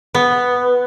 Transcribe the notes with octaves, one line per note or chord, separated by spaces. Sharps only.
B3